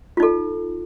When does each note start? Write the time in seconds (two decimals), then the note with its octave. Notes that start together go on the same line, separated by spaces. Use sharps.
0.17 F4
0.20 D#4
0.23 A4